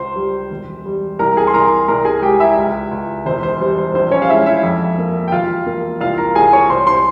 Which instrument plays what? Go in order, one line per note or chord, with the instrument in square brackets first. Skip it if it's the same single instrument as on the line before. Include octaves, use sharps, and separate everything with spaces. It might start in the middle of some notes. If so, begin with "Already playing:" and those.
Already playing: [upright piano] C#2 C5 C6
G3
E1
G3
C2 A#4 A#5
G#4 G#5
C6
C2 A#4 A#5
C2 A#4 A#5
G#4 G#5
G#3 G4 G5
E4 E5
C#2
C#2
E1 C5
C5
G3 C5
C5
A#1 C5
C#4 C#5
F5
G#3 E4 E5
E4 E5
F2
A#3
G5
E1 F4 F5
A#3
C2 F4 F5
A#4 A#5
C2 G#4 G#5
C#5 C#6
C2 C5 C6
C5 C6